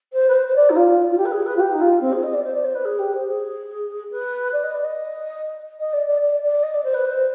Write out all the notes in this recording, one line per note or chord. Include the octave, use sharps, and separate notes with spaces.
C5
B4
C5
C5
D5
D#4
F4
F4
G4
B4
G#4
B4
F4
G4
D#4
F4
C4
G#4
D#5
D5
C5
D5
C5
B4
G#4
G4
C5
G#4
B4
D5
D#5
D5
D#5
D#5
D5
D5
D5
D5
D#5
D5
C5
B4
C5